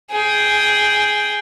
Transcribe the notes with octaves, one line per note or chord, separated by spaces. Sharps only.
G#4 G5